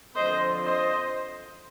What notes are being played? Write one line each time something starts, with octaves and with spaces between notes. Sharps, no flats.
D3 F3 C4 C5 D#5
C5 D#5